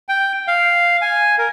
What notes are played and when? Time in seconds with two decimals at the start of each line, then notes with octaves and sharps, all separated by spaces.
0.09 G5
0.48 F5
1.01 G#5
1.38 A#4